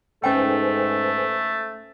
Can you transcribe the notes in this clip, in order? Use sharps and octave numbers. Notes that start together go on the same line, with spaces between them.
G#2 A3 C#4 A4 B4 C5 G5 G#5